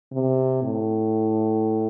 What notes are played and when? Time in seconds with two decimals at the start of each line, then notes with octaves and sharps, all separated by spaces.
0.12 C3
0.63 A2